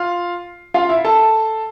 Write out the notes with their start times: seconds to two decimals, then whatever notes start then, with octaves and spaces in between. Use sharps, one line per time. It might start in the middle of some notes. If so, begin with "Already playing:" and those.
Already playing: F4 F5
0.74 F4 F5
0.89 E4 E5
1.04 A4 A5